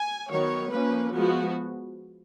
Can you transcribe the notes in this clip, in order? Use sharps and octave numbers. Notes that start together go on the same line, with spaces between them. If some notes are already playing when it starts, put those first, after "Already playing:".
Already playing: G#5
D#3 F#3 B3 C#5
F3 A#3 C#4 B4
F3 G#3 B3 F#4